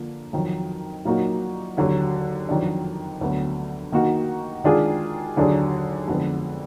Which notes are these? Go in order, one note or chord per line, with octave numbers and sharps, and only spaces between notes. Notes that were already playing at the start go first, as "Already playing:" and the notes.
Already playing: D3 F3 A#3
F2 D#3 F#3
A#2 F#3 A#3 D#4 F#4
D#2 D3 F#3
F2 D#3 F#3 D4
D2 D3 F#3 B3
D#3 A#3 D#4 F#4
D#3 G#3 D4 F4 G#4
D#2 D3 F#3 D4 G#4
F2 D3 G#3 B3